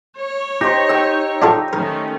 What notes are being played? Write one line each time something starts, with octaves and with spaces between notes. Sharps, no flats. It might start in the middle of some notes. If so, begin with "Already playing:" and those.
C#5
D#4 G4 C5
G5 E6
D4 F4 A4
D#3 A3 C#4 A#4